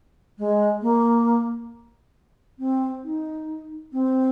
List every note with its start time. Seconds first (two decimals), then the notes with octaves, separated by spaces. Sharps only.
0.38 G#3
0.82 A#3
2.59 C4
3.04 D#4
3.93 C4